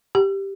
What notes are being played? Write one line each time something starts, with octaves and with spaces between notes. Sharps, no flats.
G4